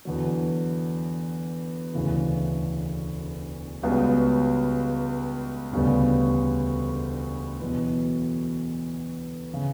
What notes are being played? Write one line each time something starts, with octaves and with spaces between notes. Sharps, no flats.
E2 D3 F#3
E1 D2 C#3 E3
C#2 C#3 G3 B3 F#4
E1 D2 C#3 G3 B3
E2 B2 F#3
C#3